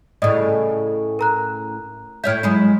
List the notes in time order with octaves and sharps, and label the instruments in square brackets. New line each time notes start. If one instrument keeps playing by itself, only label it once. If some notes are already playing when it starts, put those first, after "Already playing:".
[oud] A2 C#3 [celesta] D5 D#5 D#6
[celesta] A#4 A#5 F#6
[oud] A2 C#5 E5 [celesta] F6 G6
[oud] F#3 G#3 E4